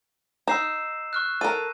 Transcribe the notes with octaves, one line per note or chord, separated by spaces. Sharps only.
D#4 E6 C7 E7
C#6 F6 F#6
A4 A#4 D#7